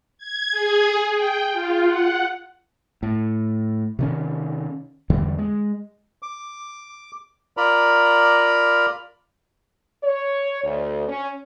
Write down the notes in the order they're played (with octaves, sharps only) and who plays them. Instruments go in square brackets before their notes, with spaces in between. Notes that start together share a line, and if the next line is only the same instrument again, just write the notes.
[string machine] G#6
G#4
G5
F4
F#5
[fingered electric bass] A2
C3 D#3 C#4
E2 D3 E3 G3
G#3
[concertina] D6
F4 A#4 D5 A#5 B5
[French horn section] C#5
D2
C#4